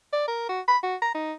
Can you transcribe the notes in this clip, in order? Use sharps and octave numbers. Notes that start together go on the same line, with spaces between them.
D5
A#4
F#4
B5
F#4
A#5
D#4